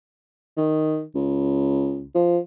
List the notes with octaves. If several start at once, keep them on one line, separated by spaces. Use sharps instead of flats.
D#3
C#2
F3